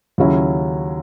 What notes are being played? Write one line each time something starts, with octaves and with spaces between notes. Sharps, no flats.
D#2 C#3 F#3 C#4 E4